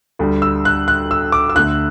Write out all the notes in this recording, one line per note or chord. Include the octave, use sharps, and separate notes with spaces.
D2 D3 G3
E6
F#6
F#6
E6
D6
E6
D2 D3 A3 F#6